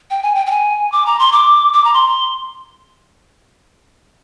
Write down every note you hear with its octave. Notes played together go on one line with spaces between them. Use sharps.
G5
G#5
G5
G5
G#5
D6
A#5
C6
D6
D6
A#5
C6